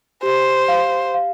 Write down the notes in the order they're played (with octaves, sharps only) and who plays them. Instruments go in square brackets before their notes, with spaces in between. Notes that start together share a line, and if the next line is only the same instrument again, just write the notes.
[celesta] G4 [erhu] C5
[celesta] F5
F5